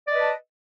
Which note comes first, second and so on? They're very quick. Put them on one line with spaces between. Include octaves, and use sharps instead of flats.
D5 D#5 B4 A5